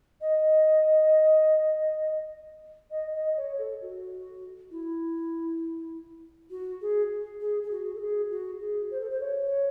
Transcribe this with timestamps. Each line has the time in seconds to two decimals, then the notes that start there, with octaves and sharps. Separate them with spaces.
0.21 D#5
2.91 D#5
3.13 D#5
3.37 C#5
3.58 A4
3.81 F#4
4.71 E4
6.50 F#4
6.81 G#4
7.41 G#4
7.63 G#4
7.71 F#4
7.95 A4
8.01 G#4
8.30 F#4
8.60 G#4
8.91 C5
9.00 A4
9.10 C5
9.20 C#5